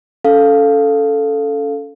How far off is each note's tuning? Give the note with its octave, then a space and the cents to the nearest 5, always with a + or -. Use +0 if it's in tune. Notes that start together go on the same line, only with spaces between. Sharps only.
C#4 +25 A4 +0 F5 +0